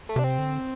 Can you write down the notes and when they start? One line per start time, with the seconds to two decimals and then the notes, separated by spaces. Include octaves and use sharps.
0.09 A3
0.16 C3 D4
0.24 C4
0.38 D3